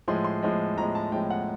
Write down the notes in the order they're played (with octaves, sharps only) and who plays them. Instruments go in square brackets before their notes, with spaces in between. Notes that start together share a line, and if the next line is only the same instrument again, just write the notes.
[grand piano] A2 F3 G#3 C6
C6
A2 F3 G#3
A2 F3 G#3 A#5
A5
A2 F3 G#3 G5
F#5